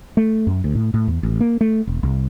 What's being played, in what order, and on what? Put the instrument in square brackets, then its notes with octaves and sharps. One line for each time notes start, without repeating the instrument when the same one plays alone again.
[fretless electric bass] A3
F#2
D2
A2
A2
E2
A1
A#3
A3
E1
C2